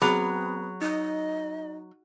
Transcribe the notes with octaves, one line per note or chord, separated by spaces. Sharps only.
F#3 B3 C4 G#4 B5
D#4 D#5